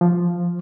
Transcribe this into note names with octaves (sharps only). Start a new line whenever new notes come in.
F3